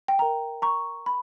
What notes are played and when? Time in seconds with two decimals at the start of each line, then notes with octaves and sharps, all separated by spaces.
0.08 G5
0.19 A#4 E5 G5 A#5
0.62 A#5 C#6
1.06 B5